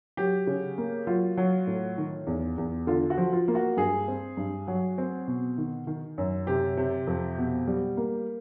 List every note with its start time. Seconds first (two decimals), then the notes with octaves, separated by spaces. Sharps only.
0.17 F#3 G4
0.47 C#3
0.78 A#3
1.07 F#3 F4
1.37 F#3
1.67 A2
1.98 D#3
2.27 E2
2.58 E2
2.87 D3 F4
3.10 F#4
3.18 F3
3.33 F4
3.48 A#3
3.55 F#4
3.77 G2 G#4
4.08 C4
4.37 G2
4.68 F#3
4.98 C4
5.28 B2
5.58 D#3
5.87 D#3
6.18 F#2
6.47 C3 G4
6.77 C3
7.07 F2
7.38 B2
7.68 G3
7.97 A#3